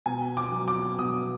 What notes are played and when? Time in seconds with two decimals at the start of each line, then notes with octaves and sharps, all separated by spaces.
0.06 B2 G#5
0.37 D6
0.52 F#3
0.68 D6
0.99 B2 D#6